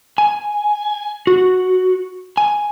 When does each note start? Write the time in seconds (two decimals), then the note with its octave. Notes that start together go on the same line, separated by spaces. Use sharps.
0.18 G#5
1.27 F#4
2.37 G#5